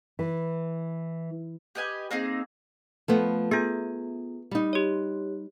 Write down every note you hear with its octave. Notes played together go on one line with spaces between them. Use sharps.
E3
G4 B4 D#5 G#5
A#3 C4 D#4 G#4
F3 A3 B3
B3 F4 G#4
G3 D#4
G4 C#5